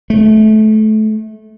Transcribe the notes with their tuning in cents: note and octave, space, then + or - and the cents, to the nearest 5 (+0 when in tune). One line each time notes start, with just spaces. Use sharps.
A3 -25